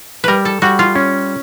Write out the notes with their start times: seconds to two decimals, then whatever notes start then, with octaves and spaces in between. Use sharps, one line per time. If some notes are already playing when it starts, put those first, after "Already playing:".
0.24 G3 A#4 B4
0.45 A4
0.62 G3 F#4
0.79 F4
0.95 C#4